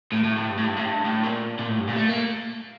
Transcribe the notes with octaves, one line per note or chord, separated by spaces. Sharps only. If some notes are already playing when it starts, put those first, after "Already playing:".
A2
A2
A2
G2
A2
G2
A2
G2
A2
A#2
A#2
A2
G2
A#2
A3
A#3